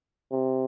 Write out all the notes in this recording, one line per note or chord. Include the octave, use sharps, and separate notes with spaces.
C3